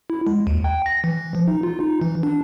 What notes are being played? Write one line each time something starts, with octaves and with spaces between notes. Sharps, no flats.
E4
G#3
D#2
G5
A#6
E3
F3
D#4
F4
D#4
E3
D4